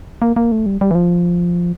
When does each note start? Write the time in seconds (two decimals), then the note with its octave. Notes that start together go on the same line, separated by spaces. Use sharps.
0.22 A#3
0.36 A#3
0.52 A3
0.66 G3
0.81 G3
0.91 E3
0.95 F3